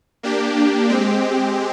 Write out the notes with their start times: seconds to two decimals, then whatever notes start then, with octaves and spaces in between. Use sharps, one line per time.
0.23 A#3 D4 G4
0.90 G#3 C4 G4